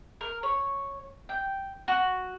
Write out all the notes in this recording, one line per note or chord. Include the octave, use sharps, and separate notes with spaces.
A#4
C#5
G5
F#4